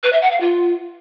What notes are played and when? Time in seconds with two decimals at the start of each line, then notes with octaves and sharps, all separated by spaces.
0.03 B4
0.12 E5
0.22 F#5
0.31 F5
0.40 F4